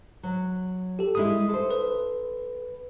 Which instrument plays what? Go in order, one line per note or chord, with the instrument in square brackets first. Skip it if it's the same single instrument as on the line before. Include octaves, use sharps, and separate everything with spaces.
[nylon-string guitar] F#3
[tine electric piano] G4 A4
[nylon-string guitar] G3 G#3 E4 [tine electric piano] D#6
[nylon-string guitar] A4 C5
[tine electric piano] B4